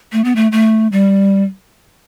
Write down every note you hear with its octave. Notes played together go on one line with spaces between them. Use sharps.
A3
B3
A3
A3
G3